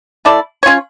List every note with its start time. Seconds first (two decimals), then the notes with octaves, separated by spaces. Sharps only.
0.25 A3 E4 A4 D5
0.63 C#4 F4 C#5